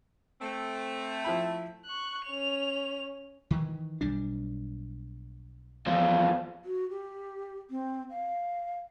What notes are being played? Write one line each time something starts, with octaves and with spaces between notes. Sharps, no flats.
A3 C4
F3 E4 B5
C#6 F#6
C#4 F7
D#3 E3
B1 G3 D4
E2 F3 F5
F#4
G4
C4
F5